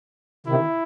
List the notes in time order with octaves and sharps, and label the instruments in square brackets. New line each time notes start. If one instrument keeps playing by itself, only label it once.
[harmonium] C3 D#3 [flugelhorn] E4